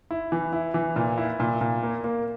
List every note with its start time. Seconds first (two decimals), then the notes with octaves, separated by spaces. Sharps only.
0.11 E4
0.32 E3
0.53 E4
0.74 E3
0.96 A#2
1.18 E4
1.40 A#2
1.61 A#2
1.83 A#3
2.04 A#3